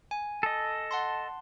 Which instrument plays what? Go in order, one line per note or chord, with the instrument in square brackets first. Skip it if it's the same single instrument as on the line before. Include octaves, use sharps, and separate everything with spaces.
[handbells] G#5
[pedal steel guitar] A4 D#5
[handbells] F#5 A5 C6